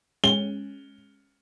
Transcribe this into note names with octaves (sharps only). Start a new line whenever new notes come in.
G#3 C#4 G7